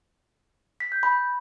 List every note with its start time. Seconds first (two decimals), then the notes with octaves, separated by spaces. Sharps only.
0.80 B6
0.92 G6
1.03 B5